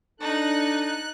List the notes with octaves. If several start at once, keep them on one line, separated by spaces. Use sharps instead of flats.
D4 D#4 A4 F#6